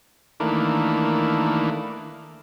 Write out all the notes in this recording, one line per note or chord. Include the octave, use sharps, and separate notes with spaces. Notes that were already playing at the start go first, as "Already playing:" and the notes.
D#3 E3 A3 A#3 D4